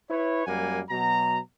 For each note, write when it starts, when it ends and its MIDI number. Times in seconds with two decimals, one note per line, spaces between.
0.10 0.46 64
0.10 0.46 71
0.10 0.46 73
0.47 0.80 42
0.47 0.80 55
0.47 0.80 58
0.47 0.80 78
0.47 0.80 80
0.90 1.39 47
0.90 1.39 54
0.90 1.39 82